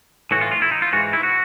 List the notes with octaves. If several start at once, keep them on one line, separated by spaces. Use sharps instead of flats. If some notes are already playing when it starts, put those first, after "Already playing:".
A2 E3 F#4
F4
F4
E4
D#4
F4
G#2 E3 F#4
E4
F#4